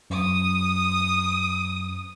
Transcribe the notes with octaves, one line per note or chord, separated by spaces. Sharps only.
F#2 D#6